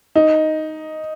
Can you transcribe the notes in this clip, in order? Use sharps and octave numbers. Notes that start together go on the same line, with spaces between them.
D#4